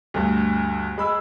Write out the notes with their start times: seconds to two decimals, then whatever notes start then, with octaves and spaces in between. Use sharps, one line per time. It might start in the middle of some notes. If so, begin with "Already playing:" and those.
0.14 D2 G2
0.98 G#3 B5 E6